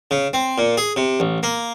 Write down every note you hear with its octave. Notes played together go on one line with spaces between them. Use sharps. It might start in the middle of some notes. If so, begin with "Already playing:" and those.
C#3
C4
A#2
G#4
C3
A1
A#3